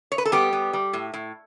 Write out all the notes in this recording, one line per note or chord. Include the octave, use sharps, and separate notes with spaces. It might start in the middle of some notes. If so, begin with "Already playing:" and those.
C#5
B4
A4
G3 B3 G4
B3
G3
A2
A2